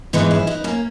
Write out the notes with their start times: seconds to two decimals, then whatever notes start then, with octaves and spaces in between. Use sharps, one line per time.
0.13 G#2 E3 G#3 B3 D#4
0.31 C#4 E4
0.47 B3 D#4
0.64 A#3 C#4